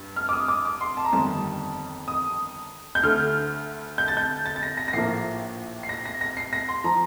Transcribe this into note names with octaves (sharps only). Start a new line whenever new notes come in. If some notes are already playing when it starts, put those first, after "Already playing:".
Already playing: G2
F6
D6
D#6
D6
D6
C6
A5
A#5
G1 F2 D#3 G3 A5
D#6
G6
D2 D3 A3 F6
G6
A6
G6
A6
A6
A#6
A#6
A#6
A#1 A2 F3 A#3 C7
C7
A#6
A#6
A#6
C7
A#6
C6
F3 A#5